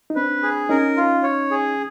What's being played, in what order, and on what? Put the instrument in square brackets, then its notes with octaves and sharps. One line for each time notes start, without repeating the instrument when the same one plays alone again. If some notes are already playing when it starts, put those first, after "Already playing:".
[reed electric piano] D#4
[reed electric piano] C4 D4 [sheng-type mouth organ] B4
[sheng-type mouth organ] G#4
[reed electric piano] C#4 D#4 [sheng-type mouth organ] A#4
[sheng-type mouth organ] F4
C#5
G#4